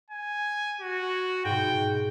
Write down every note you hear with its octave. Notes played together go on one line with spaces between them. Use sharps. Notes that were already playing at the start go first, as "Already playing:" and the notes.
G#5
F#4
G#2 B2 G5